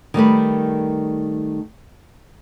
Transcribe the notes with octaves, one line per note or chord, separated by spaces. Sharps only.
D#3 G3 A3 B4